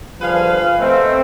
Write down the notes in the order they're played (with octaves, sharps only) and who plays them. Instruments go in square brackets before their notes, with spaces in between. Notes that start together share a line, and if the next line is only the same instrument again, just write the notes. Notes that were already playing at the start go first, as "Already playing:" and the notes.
[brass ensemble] G2 D3 F3 [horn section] G#4 B4 F5
[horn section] A3 C4 [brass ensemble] B3 C5 D#5